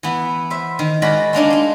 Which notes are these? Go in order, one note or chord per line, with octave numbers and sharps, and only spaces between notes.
E3 B3
C5 E5
D#3
G#3 F#4 A#4 D5 B5
G#3 A#3 D4 D#4
D#4 C6